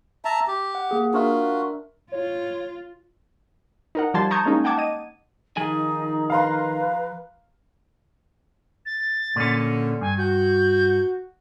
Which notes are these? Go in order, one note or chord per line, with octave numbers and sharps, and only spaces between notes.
E5 A5 A#5
G4
F#5
A#3 G#4
D4 F4 F#4 A#4 E5
F4 C#5
D#4 A#4 F#5
F3 G3 A5 C6 G#6 A6
A5 A#5 C#6 D#6 G6 G#6
G#3 A#3 C#4 D#4
F#5 G5 A5 D6 G#6
D#5 D#7
D#3 F3 D#4 G#4 G#5
B4 F5 A#5 C6
A6
A#2 D3 C#4
G2 G#5
F#4 G6